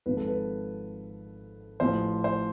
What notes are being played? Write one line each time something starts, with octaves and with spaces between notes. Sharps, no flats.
G#1 G#2 F3 B4
A4
B4
A1 A2 F3 C5
C5